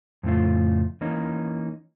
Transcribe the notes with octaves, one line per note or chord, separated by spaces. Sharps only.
F2 A2 C#3 A3 F4
E3 A#3 C#4 D#4